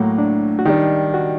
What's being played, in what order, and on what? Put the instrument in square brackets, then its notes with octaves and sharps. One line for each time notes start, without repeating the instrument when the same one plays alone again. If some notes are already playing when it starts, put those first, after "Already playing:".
Already playing: [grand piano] A2 F#3 A#3 F#4 [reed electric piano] A3
[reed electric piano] D4
F#4
[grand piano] D#3 G3 D4 [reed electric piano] D#4
[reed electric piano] F#4